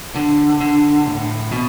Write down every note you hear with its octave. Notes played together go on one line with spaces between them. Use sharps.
D3
D3
A2
B2